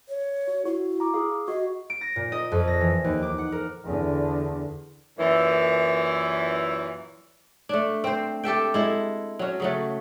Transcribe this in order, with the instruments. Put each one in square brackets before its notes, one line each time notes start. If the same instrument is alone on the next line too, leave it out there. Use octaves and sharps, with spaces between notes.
[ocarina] C#5
[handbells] F#4
[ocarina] E4 [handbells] F#4
[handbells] A#5 D6
G#4 F5
[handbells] F#4 [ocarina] D#5
[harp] D7
A#6
A#2
D#5
F2
A#6
E3
D#2
D6
F#5
A#4
[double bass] E2 D3
[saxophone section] F#2 A#2 E3
[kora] A3 D4
C4 C5
G4 A4 E5 G5
G#3 E4 A4
F#3 C#4
C#3 F#3 A3